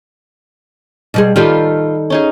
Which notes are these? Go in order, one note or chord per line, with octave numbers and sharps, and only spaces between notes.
B2 G3 G#4
D#3 G3 F4 G4 A4 B4
C#4 D#4 G#4